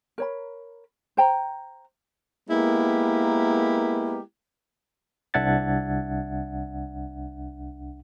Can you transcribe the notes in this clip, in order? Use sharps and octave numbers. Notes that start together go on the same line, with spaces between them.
A#4 C#5 B5
C5 G5 A#5
G#3 A#3 B3 E4 G4 A#4
C2 D4 E5 F#5 G#6 A6